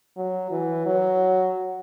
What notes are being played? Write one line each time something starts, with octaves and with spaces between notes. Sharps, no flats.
F#3
E3
F#3